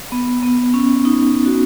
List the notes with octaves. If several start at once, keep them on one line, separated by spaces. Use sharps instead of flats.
B3
B3
C#4
D#4
F#4